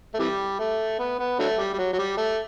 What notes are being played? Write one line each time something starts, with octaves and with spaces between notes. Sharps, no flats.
A3
C3 E3 G3
A3
B3
B3
D3 F#3 A3
G3
G3
F#3
F#3
G3
A3